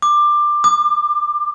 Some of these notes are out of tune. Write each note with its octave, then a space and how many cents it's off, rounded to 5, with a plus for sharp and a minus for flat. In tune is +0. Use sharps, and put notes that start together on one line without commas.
D6 +20
D6 +40